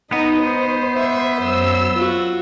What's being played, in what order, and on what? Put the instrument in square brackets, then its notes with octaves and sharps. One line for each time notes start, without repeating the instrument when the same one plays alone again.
[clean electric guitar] B3 [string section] D#4 [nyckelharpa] D#5
[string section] C5
[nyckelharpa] E5
[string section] F#2 E6 [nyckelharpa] C5
[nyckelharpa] F4 F#4